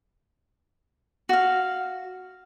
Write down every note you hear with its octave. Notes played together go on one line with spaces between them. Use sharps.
F#4 F5